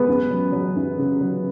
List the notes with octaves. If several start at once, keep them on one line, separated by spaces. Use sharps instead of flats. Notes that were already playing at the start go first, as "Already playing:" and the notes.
Already playing: G#3 B3 B4
F#2
F#3
F#3
F#2
C#3
F#3